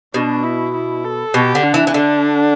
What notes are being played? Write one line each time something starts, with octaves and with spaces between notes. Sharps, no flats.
B2 D4
E4
E4
A4
B2 G4
D3
D4
E3
E3
D3 D4